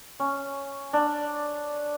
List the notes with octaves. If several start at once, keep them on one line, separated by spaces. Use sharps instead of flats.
C#4
D4